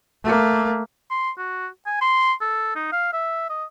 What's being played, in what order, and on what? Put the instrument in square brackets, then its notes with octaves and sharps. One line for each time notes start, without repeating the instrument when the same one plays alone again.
[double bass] A3 A#3
[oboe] C6
F#4
G#5
C6
A4
D#4
F5
E5
D#5